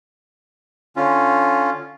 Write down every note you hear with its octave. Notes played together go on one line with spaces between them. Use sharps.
D3 C#4 F4